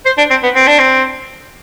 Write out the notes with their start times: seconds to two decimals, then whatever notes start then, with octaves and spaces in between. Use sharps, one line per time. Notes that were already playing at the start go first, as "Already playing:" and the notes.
0.05 C5
0.18 D4
0.30 C4
0.43 B3
0.56 C4
0.67 D4
0.79 C4